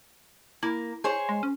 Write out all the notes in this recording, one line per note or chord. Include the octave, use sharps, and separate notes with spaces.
A#3 E4
G#4 C5 C#5
G#3
C#4